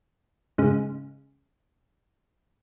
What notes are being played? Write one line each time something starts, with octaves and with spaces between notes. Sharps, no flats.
G#2 C#3